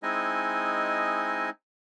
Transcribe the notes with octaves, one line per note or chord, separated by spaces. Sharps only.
G#3 C4 D#4 E4 D#5 G#5